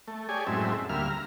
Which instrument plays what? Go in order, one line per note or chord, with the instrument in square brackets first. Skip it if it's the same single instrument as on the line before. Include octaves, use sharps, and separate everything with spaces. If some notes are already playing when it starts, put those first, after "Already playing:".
[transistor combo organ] A3
G4 G#4 C#5 D5 G#5
F#2 A2 G#3 C4 E5
D2 G3 A#3 E5 F6
A#5